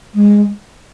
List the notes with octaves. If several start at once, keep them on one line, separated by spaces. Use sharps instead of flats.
G#3